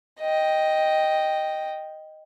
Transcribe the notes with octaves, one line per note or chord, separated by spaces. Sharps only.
D#5 G5